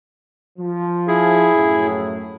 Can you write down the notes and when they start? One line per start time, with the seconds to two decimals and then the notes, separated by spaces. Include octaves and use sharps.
0.59 F3
1.08 E4 G#4
1.55 F#2 A2